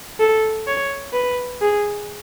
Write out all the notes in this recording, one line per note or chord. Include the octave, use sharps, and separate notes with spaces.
A4
C#5
B4
G#4